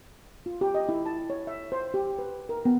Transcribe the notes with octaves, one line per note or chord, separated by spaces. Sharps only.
F4
G4
D#5
E4
A5
C#5
E5
C5
G4
B4
A#4
B3